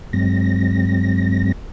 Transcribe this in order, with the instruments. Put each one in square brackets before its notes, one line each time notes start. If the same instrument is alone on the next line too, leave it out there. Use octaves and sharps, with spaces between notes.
[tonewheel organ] G2 F#3 G#3 C4 A#6